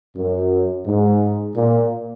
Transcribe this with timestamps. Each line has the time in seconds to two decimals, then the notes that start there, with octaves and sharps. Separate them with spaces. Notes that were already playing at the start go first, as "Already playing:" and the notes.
0.15 F#2
0.85 G#2
1.55 A#2